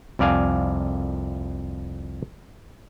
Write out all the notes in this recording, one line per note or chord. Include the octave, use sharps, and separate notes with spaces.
C2 F2 D5 F5 G#5